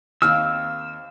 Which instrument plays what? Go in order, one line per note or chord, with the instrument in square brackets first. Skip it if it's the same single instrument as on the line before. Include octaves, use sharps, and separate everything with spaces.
[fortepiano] D#2 [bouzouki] A#3 C4 F5 [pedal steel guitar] E6 [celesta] F6